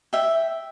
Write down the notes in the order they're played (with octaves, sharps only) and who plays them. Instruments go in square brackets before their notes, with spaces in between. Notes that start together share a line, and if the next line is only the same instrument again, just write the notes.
[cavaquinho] E5 G5